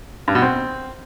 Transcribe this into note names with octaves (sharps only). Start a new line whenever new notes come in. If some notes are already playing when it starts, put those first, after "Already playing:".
G2
B2
C4